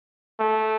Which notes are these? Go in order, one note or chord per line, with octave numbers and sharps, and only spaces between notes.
A3